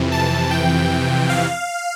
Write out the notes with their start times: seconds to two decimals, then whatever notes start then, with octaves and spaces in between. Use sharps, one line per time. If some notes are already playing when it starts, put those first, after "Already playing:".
Already playing: F2 C3 E3
0.12 A5
0.51 G5
1.29 F5